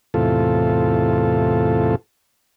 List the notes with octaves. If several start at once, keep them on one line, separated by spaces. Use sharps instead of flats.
E2 A2 C3 F4 A4